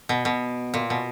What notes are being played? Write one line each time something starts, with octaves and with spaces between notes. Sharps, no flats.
B2
B2
A#2
B2